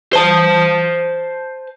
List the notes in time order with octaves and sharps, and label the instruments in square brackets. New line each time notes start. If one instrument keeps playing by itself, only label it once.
[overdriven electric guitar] C5 A5